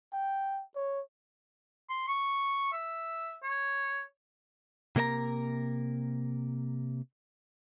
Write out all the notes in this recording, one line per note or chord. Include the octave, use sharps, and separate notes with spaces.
G5
C#5
C6
C#6
E5
C#5
C3 A#3 A#4 D#5 A#5